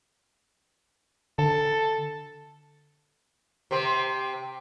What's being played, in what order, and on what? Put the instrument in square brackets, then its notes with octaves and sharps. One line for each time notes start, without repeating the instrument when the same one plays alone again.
[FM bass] D3 [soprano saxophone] A4
[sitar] C3 C4